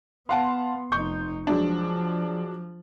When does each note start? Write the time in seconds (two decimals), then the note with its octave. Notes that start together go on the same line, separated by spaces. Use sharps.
0.29 B3 F5 F#5 A5 C6
0.92 F1 D#4 C#6 G6
1.47 F3 F#3 G#3 D4